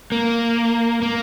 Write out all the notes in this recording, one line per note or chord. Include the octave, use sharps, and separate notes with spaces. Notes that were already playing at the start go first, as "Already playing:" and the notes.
A#3
A#3